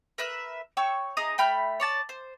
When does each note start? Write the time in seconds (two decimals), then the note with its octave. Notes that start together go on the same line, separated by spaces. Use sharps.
0.18 A#4 B4 E5 F#6
0.77 C#5 G5 C#6 E6
1.17 D#4 G#4 A#5 D#6
1.38 A3 G5 B5 F6
1.80 C#5 D5 A5
2.09 C5